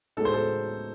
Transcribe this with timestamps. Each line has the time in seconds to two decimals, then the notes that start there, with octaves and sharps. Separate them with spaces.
0.17 A2 G#3 D#4 A4
0.25 C5
0.34 A4